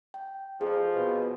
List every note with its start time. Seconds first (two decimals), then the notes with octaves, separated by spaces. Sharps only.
0.14 G5
0.61 F2 F3 G#4
0.94 B2